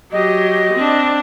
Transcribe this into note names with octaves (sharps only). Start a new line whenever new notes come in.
F#3 G4 D#5
C4 D4